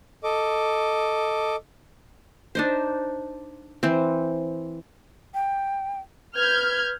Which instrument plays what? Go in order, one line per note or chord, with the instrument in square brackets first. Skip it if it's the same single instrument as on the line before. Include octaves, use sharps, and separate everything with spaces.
[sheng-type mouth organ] A4 D#5 D6
[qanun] D4 D#4 C5
E3 C4
[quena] G5
[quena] B4 [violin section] F6 G6 G#6